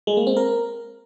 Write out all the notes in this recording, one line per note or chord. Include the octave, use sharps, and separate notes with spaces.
G#3
A#3
C4
A#4